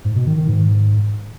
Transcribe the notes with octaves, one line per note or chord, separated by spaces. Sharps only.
G#2
B2
D#3
D#3
G#2